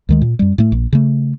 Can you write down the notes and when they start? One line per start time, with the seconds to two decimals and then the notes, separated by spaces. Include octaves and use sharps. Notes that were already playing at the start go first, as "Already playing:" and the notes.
0.09 D2 D#3 G#3
0.22 A#2
0.39 F#2 G3
0.58 A2 A3
0.72 A#1
0.93 C#3 A3